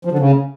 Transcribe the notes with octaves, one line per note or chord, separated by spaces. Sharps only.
F3
D3
C#3